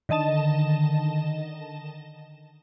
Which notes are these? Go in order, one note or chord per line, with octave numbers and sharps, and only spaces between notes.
D3 D#3 D#5 A5 E7